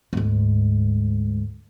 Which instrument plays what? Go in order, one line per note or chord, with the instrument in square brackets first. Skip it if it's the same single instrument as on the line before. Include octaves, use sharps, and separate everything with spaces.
[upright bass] D2 G#2